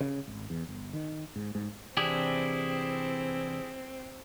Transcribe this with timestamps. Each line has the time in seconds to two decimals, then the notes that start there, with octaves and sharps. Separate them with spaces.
0.01 C#3
0.27 G#1
0.50 E2
0.69 G1
0.93 D#3
1.36 G#2
1.55 G#2
1.97 C3 E3 C4 D4 E4 G4 G#4